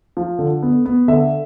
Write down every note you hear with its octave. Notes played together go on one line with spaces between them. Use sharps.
F3
D3
B3
B3
D3 E5